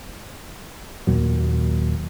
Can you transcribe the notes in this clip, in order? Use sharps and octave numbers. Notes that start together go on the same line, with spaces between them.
D#2 A#2 F#3